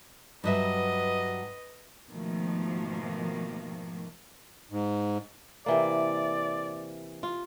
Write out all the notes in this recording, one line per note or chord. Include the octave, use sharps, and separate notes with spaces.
G2 F#3 B4 D#5 E5
G#2 B2 D#3 F3 A3 A#3
G#2
C3 E3 A#3 D5
F4